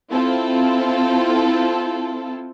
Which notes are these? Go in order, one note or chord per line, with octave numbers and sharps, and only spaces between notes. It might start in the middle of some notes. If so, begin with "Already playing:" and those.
C4 E4 F4 A4